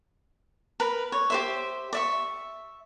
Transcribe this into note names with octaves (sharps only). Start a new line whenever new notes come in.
A#4 B4
C#5
G4 C5 E5
D5 E5 C#6